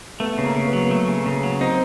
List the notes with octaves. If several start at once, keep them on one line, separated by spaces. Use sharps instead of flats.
A3 B3
C#3
A#3
C#3
B3
F#3
A3
C#3
C#3
F#3
C4 D#4